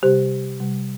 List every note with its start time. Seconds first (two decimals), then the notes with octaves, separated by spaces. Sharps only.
0.02 C3 G3 G4 C5
0.60 C3 G3